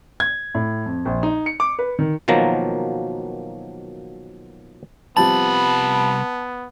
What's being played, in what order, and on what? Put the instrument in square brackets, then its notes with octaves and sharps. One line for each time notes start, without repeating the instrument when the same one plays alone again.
[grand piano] G#6
A2
F2
A#1
D#4
C#7
D6
B4
D#3
[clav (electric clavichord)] B2 D#3 F3 F#3 A#3 A#5
[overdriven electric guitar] C2 B5 [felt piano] F3 G3 C4 [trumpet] B3 [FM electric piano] A5